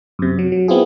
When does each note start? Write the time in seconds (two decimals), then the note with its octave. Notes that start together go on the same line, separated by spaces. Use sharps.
0.19 F#2 C3
0.39 F#3
0.52 F#3
0.68 B3 C4 E4 F4 G#4